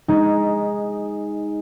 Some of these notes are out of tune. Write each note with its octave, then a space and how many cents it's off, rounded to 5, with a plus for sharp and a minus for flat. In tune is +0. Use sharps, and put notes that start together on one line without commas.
G#3 -10 D#4 +10